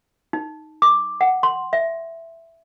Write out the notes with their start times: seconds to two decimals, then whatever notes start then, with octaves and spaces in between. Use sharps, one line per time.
0.33 D#4
0.82 D6
1.21 F#5
1.43 C6
1.73 E5